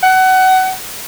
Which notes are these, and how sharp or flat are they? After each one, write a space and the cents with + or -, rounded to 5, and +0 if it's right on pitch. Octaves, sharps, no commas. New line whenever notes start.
F#5 +25